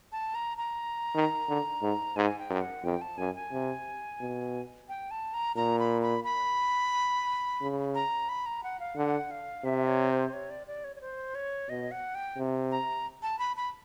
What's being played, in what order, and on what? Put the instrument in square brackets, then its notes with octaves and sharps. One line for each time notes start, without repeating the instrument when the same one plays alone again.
[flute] A5
A#5
A#5
[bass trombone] D#3
D3
G#2
[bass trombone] G#2 [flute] G#5
[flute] G5
[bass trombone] F#2
[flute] F#5
[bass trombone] F2 [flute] G5
[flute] A5
[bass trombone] F#2 [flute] G#5
[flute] G#5
[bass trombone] C3
B2
[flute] G5
A5
A#5
[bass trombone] A#2 [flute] A#5
[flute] B5
B5
B5
[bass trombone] C#3
[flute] A#5
B5
A#5
F#5
F5
[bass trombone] D3 [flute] F#5
[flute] F5
[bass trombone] C3 [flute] E5
[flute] C#5
C5
C#5
D5
D5
C#5
C#5
C5
C#5
[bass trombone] B2 [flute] D#5
[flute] F#5
G5
[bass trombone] C3
[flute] A#5
A5
B5
B5